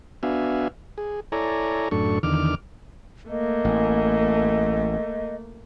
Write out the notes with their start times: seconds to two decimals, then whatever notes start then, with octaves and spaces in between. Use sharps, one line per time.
0.23 B3 D4 F#4 E5 F5 G#5
0.98 G#4
1.32 E4 A4 C#5 D5 G#5 A#5
1.91 F#2 A2 D4 A4 C#6
2.23 E2 D3 D#3 D6 F6
3.29 A3 A#3 D#5
3.65 A1